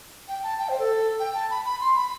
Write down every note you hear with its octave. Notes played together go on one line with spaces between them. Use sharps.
G5
A5
G5
C5
A4
G5
A5
B5
B5
C6
B5